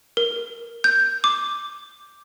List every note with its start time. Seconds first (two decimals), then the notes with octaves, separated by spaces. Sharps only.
0.17 A#4
0.84 G6
1.24 D6